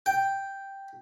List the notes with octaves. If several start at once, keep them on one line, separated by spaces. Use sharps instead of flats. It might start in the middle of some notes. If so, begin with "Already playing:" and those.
G5